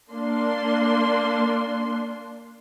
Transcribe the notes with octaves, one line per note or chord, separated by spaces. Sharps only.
A#3 D4 C6